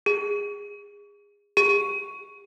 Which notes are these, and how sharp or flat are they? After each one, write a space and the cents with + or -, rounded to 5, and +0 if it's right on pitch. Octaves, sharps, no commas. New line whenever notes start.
G#4 -25
G#4 -45